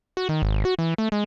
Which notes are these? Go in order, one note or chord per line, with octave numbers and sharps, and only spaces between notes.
F#4
D#3
G#1
F#4
E3
A3
G#3